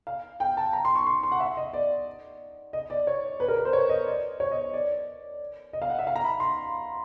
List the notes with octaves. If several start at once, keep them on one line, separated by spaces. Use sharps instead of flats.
F5
G5
A5
A#5
C6
C#6
C6
C6
F#5
E5
D#5
D5
D#5
D5
C#5
B4
A#4
B4
C5
C#5
D#5
D5
C#5
D#5
D5
D#5
F5
F#5
E5
F5
A#5
B5
C6